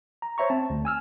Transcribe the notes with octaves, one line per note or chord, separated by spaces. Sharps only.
A#5
C5 C#5 E5 A#5 C#6
C4 A5
D2
G#5 E6 F6